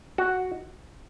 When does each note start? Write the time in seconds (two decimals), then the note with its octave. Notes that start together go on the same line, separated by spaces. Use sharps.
0.18 F#4